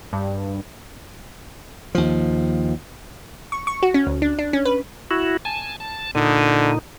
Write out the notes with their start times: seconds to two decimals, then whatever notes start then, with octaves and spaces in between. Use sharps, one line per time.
0.13 G2
1.95 D#2 F3
3.52 C#6
3.67 C#6
3.83 F#4
3.94 C#4
4.07 D2
4.22 D4
4.39 D4
4.53 C#4
4.65 B4
5.11 E4 F#4
5.45 G#5 A5
5.80 A5
6.15 A#2 D3 D#4